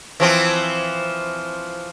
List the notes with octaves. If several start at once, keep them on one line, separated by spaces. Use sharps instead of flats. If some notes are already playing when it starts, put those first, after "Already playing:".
E3 F3 C4